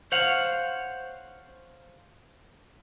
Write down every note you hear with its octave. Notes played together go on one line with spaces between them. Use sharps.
C5 C#5 F5 F#5